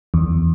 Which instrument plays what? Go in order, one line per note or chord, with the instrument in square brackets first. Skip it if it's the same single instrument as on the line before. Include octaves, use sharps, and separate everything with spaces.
[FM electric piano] E2